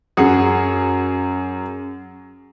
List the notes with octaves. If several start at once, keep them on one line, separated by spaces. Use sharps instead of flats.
F#2 G#4 F#5